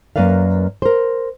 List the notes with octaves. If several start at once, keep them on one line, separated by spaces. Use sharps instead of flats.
F#2 A#3 B4 D5 F5
A#4 C5